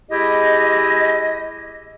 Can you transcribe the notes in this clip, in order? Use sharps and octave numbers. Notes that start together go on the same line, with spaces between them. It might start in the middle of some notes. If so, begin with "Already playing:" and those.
G#3 E4 G4 D#5